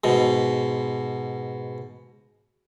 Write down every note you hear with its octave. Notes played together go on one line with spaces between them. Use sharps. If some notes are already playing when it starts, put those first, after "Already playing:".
G#2 B2